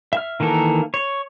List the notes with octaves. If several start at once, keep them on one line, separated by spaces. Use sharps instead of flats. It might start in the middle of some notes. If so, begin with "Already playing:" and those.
E5 F6
D#3 E3 A#3 A4 A#4
C#5